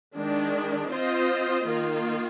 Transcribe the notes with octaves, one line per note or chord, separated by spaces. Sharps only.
D#3 G#3 D4
C4 F4 C5 D#5
D#3 A#3 F4